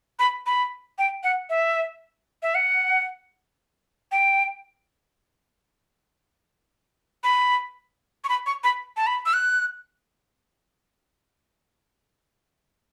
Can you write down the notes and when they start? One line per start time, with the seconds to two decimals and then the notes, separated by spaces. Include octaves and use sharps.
0.19 B5
0.46 B5
0.98 G5
1.24 F#5
1.50 E5
2.43 E5
2.55 F#5
4.12 G5
7.24 B5
8.24 C#6
8.29 B5
8.46 C#6
8.64 B5
8.97 A5
9.07 B5
9.26 E6
9.33 F#6